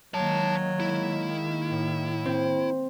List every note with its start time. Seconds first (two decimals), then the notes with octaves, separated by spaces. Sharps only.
0.14 D#3 F#3 G#3 A#3 C#5 A5
0.80 E4
1.71 A2
2.25 C4